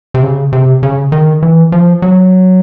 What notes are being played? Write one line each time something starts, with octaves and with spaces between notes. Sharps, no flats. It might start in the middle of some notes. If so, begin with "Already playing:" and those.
C3
C#3
C3
C#3
D#3
E3
F3
F#3